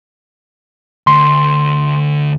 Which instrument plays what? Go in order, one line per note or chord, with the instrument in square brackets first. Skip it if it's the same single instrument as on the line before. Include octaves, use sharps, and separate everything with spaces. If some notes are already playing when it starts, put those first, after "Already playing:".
[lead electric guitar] D2 [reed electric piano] C6